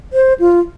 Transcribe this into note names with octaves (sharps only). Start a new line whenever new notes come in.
C5
F4